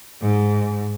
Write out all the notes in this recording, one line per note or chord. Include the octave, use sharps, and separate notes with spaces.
G#2